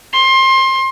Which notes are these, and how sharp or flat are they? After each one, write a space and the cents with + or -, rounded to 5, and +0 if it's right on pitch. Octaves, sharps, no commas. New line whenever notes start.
C6 +25